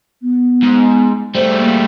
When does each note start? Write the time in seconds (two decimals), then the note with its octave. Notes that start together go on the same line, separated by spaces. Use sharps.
0.22 B3
0.63 G#2
1.35 G3 A3 C5
1.59 A#3